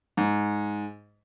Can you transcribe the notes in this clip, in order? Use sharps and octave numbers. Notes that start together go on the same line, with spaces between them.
G#2